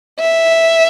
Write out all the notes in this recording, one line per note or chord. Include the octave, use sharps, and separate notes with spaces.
E5